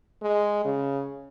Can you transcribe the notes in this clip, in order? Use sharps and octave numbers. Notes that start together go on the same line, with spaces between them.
G#3
C#3